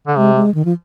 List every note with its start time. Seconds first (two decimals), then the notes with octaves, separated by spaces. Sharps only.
0.07 D3
0.17 C3 G#3
0.35 G#3
0.55 D#3
0.65 F3